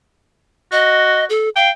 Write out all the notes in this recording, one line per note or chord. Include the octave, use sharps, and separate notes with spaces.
F#4 D#5
A4
F5 G5